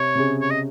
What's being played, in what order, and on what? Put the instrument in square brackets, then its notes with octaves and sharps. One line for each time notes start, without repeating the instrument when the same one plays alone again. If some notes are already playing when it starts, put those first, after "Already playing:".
Already playing: [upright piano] C3 [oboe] C#5
[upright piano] C3
C#3
[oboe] C#5
D#5